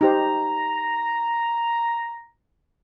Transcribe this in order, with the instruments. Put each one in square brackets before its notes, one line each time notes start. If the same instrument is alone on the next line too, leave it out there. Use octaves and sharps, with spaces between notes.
[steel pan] D#4 G4 C5 [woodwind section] A#5